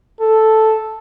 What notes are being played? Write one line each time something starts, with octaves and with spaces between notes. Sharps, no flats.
A4